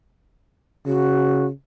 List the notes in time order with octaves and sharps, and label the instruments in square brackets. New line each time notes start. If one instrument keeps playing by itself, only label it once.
[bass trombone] C#3 [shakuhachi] F#4